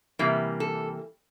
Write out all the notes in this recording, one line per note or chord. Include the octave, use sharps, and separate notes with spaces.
C3 E3 G3 A#3
A4